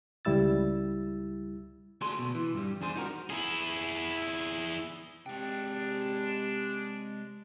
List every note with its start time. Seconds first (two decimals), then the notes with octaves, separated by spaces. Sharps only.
0.25 C#2 G3 E4 E6 A6
2.01 D2 F#4 G#4 A4 D5 C6
2.19 B2
2.35 E3
2.55 G2 G3
2.81 E2 D4 G#4 C5
2.96 D#4 F#4 A#4
3.30 E4 G#4
5.26 C3 G#3 D4 G5